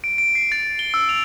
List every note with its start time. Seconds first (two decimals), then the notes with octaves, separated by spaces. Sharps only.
0.04 D7
0.18 D7
0.35 C7
0.52 A6
0.79 G7
0.94 E6
1.09 F7